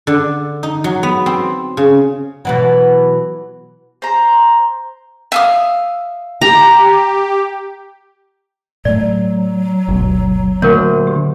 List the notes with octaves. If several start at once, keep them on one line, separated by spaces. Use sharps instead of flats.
D3
D#4
F#3
B3
C4
C#3
B2 E3 F#3
C5 A#5
E5 F5 D#6
G4 A#5
A2 F#3 A3 D5
G1 D2 B2
D2 A#2 A#4 C#5
G4